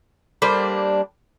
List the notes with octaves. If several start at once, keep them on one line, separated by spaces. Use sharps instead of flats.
G3 A#3 D4 C5